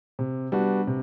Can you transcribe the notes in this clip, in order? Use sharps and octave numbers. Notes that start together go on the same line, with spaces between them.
C3
G3 B3 D4 F#4
C3